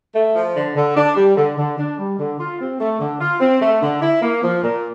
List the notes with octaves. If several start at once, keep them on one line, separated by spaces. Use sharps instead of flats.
A3
F3
D3
D3
D4
G3
D3
D3
D4
G3
D3
F4
C4
A3
D3
F4
C4
A3
D3
E4
A#3
F3
A#2